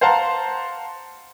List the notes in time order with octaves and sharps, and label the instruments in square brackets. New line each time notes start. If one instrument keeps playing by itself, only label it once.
[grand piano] C5 F5 F#5 A5 A#5